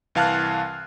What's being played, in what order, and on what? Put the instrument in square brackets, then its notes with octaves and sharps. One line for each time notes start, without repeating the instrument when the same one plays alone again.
[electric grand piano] C2 E3 F5 A5 F6 F#6